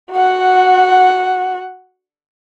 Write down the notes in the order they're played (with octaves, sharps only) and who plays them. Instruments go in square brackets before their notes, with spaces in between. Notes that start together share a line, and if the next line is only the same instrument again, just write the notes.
[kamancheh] F#4 F#5